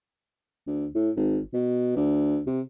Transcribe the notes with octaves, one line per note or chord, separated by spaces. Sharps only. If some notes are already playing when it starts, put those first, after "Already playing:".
D2
A2
G#1
B2
D2
C3